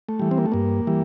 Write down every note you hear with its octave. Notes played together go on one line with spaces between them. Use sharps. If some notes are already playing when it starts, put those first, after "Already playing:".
A3
E3 G3
C4
A#3
A3
G2 A#3
E3 G3